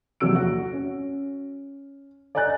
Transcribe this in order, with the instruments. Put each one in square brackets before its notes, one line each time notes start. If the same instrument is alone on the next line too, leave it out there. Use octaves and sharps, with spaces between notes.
[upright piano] A#1 E2 C3 F#3 E6 D7
F#4
C#4
D5 D#5 G#5 A#5 F#6 A6